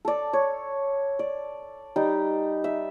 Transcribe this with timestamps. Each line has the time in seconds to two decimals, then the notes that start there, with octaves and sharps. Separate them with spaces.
0.05 A4 D5
0.33 C#5
1.19 D5
1.96 G3 D#4
2.64 E5